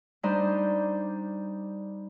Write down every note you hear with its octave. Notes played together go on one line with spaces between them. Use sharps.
G3 D4 D#4 C5